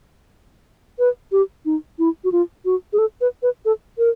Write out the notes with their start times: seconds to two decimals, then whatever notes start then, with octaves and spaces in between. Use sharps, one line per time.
0.99 B4
1.32 G4
1.65 D#4
1.99 E4
2.24 F#4
2.32 F4
2.65 F#4
2.93 G#4
2.98 A4
3.21 B4
3.43 B4
3.65 A4
3.98 A#4